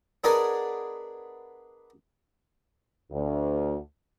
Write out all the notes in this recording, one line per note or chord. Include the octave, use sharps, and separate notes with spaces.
B3 D4 G#4 A#4 D5 D#5
D2